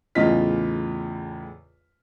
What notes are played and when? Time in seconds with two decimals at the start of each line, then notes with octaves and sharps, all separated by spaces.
0.15 E2 A2 C#3 F4 D#5 B6